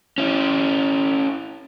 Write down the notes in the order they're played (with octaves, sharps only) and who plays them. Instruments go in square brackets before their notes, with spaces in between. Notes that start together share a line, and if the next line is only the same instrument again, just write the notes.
[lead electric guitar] C#4 E4